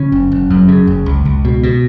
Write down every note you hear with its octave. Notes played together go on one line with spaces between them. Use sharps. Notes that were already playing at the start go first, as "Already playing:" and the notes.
Already playing: C#3 C#4
F#1
F#1
F#2
C#3
F#1
C#2
C#2
B2
B2